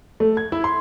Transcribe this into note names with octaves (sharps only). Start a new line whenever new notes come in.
A3
G#6
E4
C6